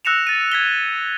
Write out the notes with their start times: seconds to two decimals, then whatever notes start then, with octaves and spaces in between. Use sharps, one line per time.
0.05 E6 F#6 A#6 C#7 E7 F7
0.27 A6 D#7
0.52 G#6 B6 G7